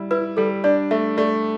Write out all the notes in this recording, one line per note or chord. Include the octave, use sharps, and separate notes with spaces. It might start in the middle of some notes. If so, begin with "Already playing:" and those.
Already playing: G3 E4
E4 B4
G3 A4
D4 D5
A3 E5
A3 D5